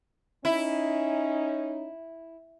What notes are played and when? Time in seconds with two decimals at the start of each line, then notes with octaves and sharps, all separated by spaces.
0.45 C#4 D#4 E4